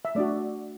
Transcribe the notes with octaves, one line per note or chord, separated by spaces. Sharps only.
E5
A3 D4 F#4 D5